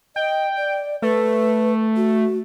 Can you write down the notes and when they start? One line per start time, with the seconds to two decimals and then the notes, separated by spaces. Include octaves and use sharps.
0.16 D#5 G5
0.57 D5
1.02 A3 B4
1.96 F#4